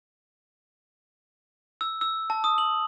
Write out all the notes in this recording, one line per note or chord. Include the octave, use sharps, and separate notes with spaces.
E6
E6
A5
D#6
F#7